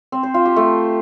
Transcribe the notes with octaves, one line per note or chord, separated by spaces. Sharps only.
C4
C5
F4
G4
A3